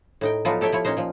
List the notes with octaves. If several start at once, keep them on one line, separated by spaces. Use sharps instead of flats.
A2 D#4 G5
F3 F#3 A3 B3 D#4 F4
G4 A4 C#5 E5 G5
F3 E4 C#5
A#2 C#4 D#4 C5
A#2 F3